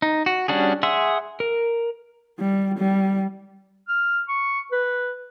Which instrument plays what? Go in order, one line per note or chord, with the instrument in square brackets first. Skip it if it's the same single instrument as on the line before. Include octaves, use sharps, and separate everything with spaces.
[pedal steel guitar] D#4
F#4
G3 C#4 D4 F#4 G#4
G#4 E5 F#5 C6 E6
A#4
[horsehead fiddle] G3
G3
[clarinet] F6
C#6
B4